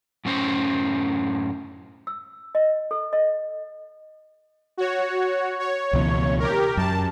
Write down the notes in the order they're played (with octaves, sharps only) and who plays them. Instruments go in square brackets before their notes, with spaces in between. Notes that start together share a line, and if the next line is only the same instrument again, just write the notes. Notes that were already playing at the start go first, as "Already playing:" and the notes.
[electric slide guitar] F#2 A2 C#4 C5
[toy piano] E6
D#5
A4
D#5
[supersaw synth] F#4 C#5
C#5
[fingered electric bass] C#2 B2 E3
[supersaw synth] G4 A#4
[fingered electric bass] F#2 [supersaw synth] A5